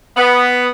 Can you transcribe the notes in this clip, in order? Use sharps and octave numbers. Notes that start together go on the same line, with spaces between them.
B3